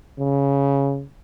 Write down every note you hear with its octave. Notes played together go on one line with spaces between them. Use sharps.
C#3